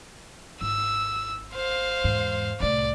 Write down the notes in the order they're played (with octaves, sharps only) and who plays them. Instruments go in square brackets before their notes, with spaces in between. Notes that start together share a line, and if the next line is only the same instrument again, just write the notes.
[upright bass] G#1 E4 [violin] E6
[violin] C5 F5
[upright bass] E2 G#2
[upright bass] C2 A2 [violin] D5